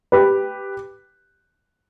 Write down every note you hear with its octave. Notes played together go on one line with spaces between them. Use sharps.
G4 B4